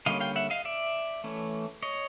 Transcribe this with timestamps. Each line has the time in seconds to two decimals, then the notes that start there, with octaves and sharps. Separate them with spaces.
0.06 D3 G3 A#3 C#4 D#5 F5
0.21 F5 G5
0.36 E5 F#5
0.50 D#5 F5
0.65 D5 E5
1.24 E3 A3 C#4
1.83 C#5 D#5